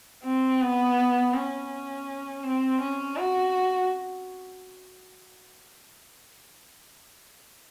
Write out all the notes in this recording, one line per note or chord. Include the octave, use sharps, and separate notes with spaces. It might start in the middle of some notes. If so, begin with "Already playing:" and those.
C4
B3
C#4
C4
C#4
F#4